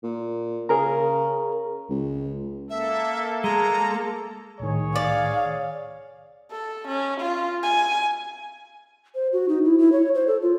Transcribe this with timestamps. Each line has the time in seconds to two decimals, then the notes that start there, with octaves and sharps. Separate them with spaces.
0.04 A#2
0.69 C#3 G#4 A#4 A#5
1.90 C#2
2.70 A#3 A4 E5
3.44 G#3 A#5
4.60 C2 A2 D#3 G#4 C#5
4.96 D5 F5
6.51 A4
6.88 C#4
7.20 F4
7.63 G#5
9.15 C5
9.33 F#4
9.49 D#4
9.64 E4
9.78 E4
9.92 C#5
10.14 C5
10.27 A4
10.42 F4